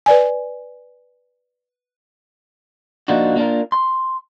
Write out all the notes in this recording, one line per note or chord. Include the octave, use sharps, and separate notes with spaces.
B4 D5 G#5
F3 A#3 D4 D#4 F4 F#4
A#3 D4 F4 A#4
C6